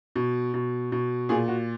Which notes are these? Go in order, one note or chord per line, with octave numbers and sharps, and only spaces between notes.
B2
B2
B2
A#2 G#4
F#4